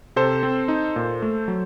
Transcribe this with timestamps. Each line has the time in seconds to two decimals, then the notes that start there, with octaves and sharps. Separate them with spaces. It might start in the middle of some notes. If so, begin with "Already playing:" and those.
0.16 C3 A4 C5
0.43 C4
0.68 D#4
0.96 A#2
1.22 A3
1.48 F#3